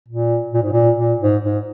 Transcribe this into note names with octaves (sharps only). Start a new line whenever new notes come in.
A#2
A#2
G#2
A#2
A#2
G#2
G#2